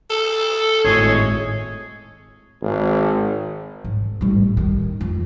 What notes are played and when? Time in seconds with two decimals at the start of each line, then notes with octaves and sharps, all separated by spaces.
0.10 A4
0.85 G#1 A2 G#3 G#4 C#5
2.62 G#1
3.84 G#2
4.21 A1 G3
4.57 D#3
5.01 F2